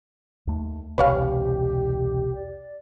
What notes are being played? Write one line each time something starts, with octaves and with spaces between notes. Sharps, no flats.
D#2 A3
E1 C2 G4 B4 C#5 F5
D5